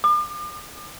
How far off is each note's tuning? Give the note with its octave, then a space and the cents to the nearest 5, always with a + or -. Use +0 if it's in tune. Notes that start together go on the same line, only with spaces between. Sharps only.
D6 +40